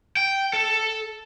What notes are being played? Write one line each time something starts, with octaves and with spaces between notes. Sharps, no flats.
G5
A4